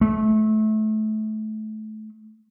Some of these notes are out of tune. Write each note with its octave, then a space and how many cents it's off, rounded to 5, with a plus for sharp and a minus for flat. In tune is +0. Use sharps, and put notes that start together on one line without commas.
A3 -25